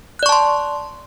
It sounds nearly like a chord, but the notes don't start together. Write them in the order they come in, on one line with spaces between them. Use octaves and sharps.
F#6 D5 C#6 A5 C6